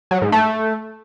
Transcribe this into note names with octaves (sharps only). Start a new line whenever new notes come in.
F#3
G#2
A3